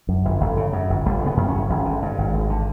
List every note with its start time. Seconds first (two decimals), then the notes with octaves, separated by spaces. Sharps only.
0.09 F#2
0.25 G1
0.40 G1
0.57 C#3
0.73 F#2
0.90 G1
1.05 G1 G3
1.21 C#3
1.26 B3
1.37 F#2
1.48 C#4
1.54 G1
1.69 G#1
1.85 D3
2.02 G2
2.18 G#1
2.34 G#1
2.50 D3